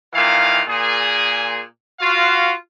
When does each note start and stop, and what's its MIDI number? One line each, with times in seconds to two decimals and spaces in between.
0.14 0.61 46
0.14 0.61 51
0.14 0.61 52
0.14 0.61 77
0.67 1.60 46
0.67 1.60 68
2.00 2.52 65
2.00 2.52 66
2.00 2.52 77